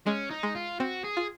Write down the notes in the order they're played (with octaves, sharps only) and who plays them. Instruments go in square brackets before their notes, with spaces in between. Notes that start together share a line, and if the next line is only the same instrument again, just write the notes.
[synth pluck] G#3 [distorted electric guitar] C#4
[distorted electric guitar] D#4
[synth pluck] G#3
[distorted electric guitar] F4
[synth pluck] C4 [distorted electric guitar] F#4
[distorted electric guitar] G#4
[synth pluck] F4